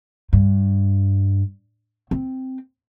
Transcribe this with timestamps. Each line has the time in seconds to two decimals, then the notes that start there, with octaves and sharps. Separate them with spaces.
0.33 G2
2.11 C4